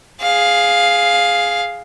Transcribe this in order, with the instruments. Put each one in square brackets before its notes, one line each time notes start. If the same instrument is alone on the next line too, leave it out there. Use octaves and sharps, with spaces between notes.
[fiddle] G#4 F5